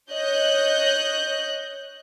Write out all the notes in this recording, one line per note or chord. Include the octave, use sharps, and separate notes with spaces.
C#5 D#5 F#6 G6